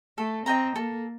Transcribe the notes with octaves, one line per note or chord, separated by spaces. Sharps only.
A3 A4
C4 D#5 G5 A#5
A#3 A4